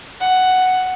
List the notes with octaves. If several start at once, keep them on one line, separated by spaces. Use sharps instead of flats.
F#5